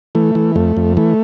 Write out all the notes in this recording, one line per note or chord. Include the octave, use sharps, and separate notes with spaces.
E3 A3
E3
F2 A3
F2
E3 A3